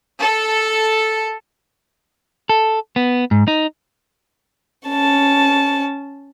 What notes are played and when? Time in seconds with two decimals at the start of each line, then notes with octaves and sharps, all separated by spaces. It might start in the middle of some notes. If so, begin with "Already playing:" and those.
0.19 A4
2.49 A4
2.96 B3
3.31 G#2
3.48 D#4
4.88 C#4 A5